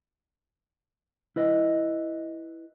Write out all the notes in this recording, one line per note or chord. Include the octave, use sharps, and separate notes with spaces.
E4 B4 D#5